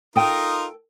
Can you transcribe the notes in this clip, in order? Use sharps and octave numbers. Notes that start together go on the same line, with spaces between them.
D#4 F4 A4 A#4 G5 D#6